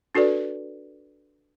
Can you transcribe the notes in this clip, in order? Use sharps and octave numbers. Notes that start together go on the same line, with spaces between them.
D4 F#4 A4 B4 D5